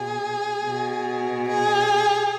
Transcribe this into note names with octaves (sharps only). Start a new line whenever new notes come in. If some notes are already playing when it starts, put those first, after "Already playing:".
Already playing: B2 G#4
B2
G#4